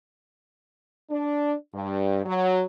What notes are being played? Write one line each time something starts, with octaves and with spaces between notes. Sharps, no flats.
D4
G2
F#3